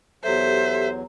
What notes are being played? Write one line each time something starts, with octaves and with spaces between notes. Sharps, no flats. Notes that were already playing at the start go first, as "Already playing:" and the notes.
E2 F#3 G4 A4 C5 E5